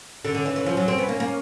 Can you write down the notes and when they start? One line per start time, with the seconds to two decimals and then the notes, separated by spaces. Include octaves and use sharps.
0.24 D3 C#4
0.35 D3
0.46 E3
0.56 E3
0.66 F3
0.77 F#3
0.88 C4 C#4
0.98 B3
1.09 A#3
1.20 A#3